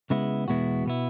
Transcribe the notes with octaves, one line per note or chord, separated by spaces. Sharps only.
C#3 G#3 B3 E4
E2 B2 G#3 B3 E4 F#4
B2 B3 E4